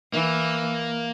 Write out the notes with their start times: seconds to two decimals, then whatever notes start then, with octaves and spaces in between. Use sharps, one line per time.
0.13 E3 A#3